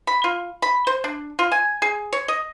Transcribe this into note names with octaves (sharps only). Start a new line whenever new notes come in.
B5
F4
B5
C5
D4
F4
G#5
G#4
C#5
D#5